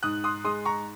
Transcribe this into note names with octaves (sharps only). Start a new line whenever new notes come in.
G#2 D#6 F#6
C6 D#6
G#3 C6 D#6
A#5 C#6